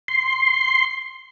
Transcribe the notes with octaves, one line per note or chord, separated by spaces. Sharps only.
C6